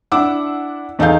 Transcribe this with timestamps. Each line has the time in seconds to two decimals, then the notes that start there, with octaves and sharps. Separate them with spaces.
0.12 D4 E4 F#5 D6 E6
0.99 E2 D#4 A4 D#5 F5 G6